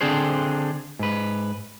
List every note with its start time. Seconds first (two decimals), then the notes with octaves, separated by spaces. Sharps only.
0.01 D3 C4 D4 G#4 C5
0.99 G#2 B4